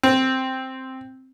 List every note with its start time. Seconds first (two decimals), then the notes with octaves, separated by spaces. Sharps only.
0.03 C4